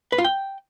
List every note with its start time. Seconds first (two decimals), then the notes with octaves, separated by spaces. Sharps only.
0.12 B4
0.18 F4
0.24 G5